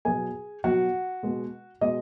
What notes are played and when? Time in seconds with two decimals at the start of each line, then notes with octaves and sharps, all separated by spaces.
0.05 B2 F#3 B3 G#4 G#5
0.64 B2 F#3 B3 F#4 F#5
1.23 B2 G#3 B3
1.81 B2 G#3 B3 D#5